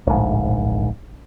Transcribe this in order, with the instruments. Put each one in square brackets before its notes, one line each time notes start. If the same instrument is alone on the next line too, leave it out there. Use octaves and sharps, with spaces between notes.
[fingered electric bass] D1 A#1 G#2